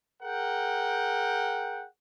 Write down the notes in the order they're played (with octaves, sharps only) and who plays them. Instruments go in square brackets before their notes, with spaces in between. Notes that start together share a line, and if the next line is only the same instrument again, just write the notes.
[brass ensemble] G#4 A#4 F#5 G5